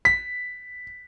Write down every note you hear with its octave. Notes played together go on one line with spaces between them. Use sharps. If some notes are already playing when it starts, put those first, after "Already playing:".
B6